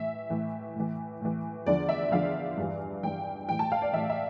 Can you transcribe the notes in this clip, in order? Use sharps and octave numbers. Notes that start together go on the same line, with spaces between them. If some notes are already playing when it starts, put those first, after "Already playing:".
Already playing: A2 E3 E5
A2 E3
A2 E3
A2 E3
E2 D3 F3 D5
E5
E2 D3 F3 F5
G2 E3
G2 E3 G5
A2 E3 G5
A5
F5
D5
A2 E3 E5
E5